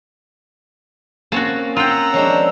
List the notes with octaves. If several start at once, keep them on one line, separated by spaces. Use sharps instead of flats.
A#3 C4 C#4 F#4 C#5 A5
F4 F#5 G5 A#5 E6
F3 G#3 D4 C#5